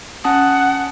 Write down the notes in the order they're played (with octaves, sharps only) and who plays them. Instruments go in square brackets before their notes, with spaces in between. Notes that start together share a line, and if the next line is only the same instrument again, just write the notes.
[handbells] C#4 A5 D#6 [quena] F#5